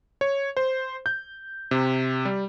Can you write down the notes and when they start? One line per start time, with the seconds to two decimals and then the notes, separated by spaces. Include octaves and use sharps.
0.21 C#5
0.57 C5
1.06 G6
1.71 C3
2.25 G3